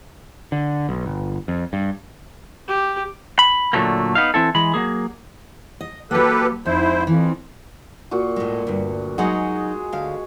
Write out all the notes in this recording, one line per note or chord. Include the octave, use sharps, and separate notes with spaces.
D3
B1
G1
F2
G2
G4
B5
A#2 D3 F3 F#3 A3 A#3
B3 D#4 F5
E3 C4 E4 A4
E3 G#3 B5
F#3 G#3 A#3 G#4
D#5
F#3 A#3 G4 A4 B4
F2 G#2 E4 C5
F2 E3
A#2 F#4
A2 G#3
D2 G2
F#3 G#3 D#4 F#4 G#4 F#5
D2 F5